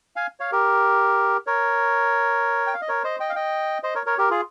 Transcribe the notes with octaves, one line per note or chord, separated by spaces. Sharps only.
F5 G#5
C#5 F5
G4 A#4
A#4 C#5
G5
F5
D#5
A#4 C#5
C5 D#5
D#5 G5
F5
D#5 G5
C5 D#5
A#4 C#5
A#4 C#5
G4 A#4
F4 G#4